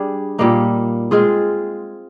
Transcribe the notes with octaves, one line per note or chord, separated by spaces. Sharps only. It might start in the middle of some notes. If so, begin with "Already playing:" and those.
Already playing: G3 D4 G#4
A#2 G3 A#3 D#4
G#3 C4 F4 G#4